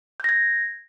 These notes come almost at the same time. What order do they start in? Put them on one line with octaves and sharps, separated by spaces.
G6 A#6 G#6